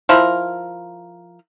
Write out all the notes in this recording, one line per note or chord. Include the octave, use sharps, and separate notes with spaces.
F3 E4 A#4